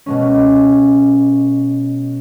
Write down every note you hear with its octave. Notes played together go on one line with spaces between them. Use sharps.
B2 G#3 C#4